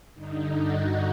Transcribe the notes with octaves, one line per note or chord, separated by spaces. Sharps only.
G2 D3 D#4
F#4